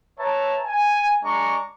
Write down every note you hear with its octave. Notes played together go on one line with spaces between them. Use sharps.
B4 C#5 E5 A5 A#5
G#5
G#3 D4 A#5 C#6 D6